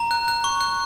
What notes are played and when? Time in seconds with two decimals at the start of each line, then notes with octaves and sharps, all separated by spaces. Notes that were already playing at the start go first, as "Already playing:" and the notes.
Already playing: A#5
0.11 F#6
0.28 F#6
0.44 C#6
0.61 F#6